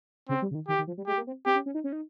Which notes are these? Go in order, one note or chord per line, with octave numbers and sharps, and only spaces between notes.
C#3 C4
G3
C#3
D#3
D#3 G4
D#3
F3
G3
G#3 G4
A#3
C4
C4 G4
C#4
C#4
D#4
C#4
D#4